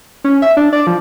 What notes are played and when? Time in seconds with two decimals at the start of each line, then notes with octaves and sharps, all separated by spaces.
0.24 C#4
0.42 E5
0.57 D4
0.73 D5
0.87 F3